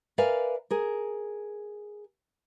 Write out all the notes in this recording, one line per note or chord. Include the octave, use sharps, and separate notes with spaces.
A#4 B4 D5 E5 F5 G#5
G#4 A#4